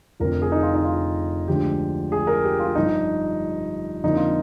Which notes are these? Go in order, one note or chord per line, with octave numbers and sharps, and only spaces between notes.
F1 F2 D3 F3 A#4
G#4
D#4
F4
D#4
F4
D2 D3 F3 G#3 D4 G4
G#4
A#4
G4
F4
G1 G2 F3 D#4
F2 D3 F3 A#3 D#4
F4